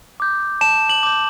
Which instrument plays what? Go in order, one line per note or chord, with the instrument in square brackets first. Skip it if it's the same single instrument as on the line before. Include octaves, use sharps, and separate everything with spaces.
[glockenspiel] D6 G6
A5 E7
F#7
D6 G6